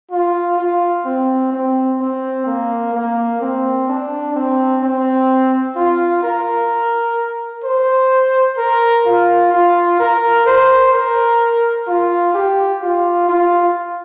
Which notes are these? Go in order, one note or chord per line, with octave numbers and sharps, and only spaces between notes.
F4
F4
C4
C4
C4
A#3
A#3
C4
D4
C4
C4
F4
A#4
C5
A#4
F4
F4
A#4
C5
A#4
F4
G4
F4
F4